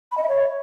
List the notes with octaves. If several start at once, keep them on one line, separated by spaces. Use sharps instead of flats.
B5
D#5
E5
C#5